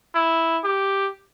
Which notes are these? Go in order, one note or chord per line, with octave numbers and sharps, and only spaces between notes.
E4
G4